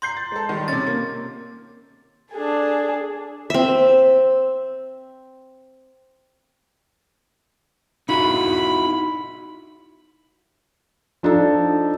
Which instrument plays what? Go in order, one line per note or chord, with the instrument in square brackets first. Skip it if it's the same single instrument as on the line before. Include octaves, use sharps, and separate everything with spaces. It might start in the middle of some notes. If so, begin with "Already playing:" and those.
[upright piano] A#5 G6 C7 [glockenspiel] C6
[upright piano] A6
G#3 A4
D#3 G3
[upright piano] C3 C#4 [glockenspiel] A6
[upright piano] A#3
[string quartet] D4 G#4 A4
[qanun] C4 E5
[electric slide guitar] D#4 E4 F#4 [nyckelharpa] B5
[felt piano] F3 D4 D#4 A4